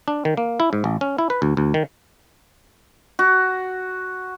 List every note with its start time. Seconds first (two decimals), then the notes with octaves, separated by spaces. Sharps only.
0.08 D4
0.25 D#3
0.37 A#3
0.60 E4
0.73 G#2
0.84 A1
1.01 C#4
1.18 E4
1.30 B4
1.42 D2
1.57 D2
1.74 D#3
3.19 F#4